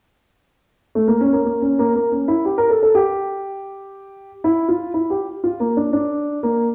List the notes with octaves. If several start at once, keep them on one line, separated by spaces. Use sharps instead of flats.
A3
A#3
C#4
A#3
A#3
C#4
A#3
A#3
C#4
E4
G4
A#4
A4
A4
G4
E4
F4
E4
G4
F4
A#3
D4
D4
A#3